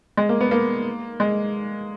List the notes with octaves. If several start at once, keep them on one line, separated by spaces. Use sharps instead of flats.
G#3
A#3
B3
A#3
G#3